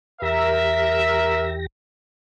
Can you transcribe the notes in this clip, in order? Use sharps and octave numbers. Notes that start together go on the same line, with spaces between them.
E2 G4 A#4 E5 A#6